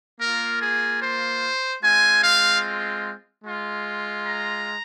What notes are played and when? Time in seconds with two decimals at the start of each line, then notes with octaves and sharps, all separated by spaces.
0.19 A#3 F4 A#4
0.60 G#4
1.00 C5
1.82 G#3 C4 F4 G#5
2.22 F5
3.44 G#3 F4
4.25 A#5